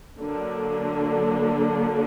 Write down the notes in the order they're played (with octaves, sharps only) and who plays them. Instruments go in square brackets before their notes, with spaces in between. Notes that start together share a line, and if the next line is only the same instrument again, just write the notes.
[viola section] D3 F#3 A#3 D4